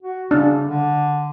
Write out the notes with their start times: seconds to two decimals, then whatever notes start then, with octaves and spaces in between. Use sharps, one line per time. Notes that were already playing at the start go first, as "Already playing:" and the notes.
0.03 F#4
0.31 C#3 D4
0.66 D3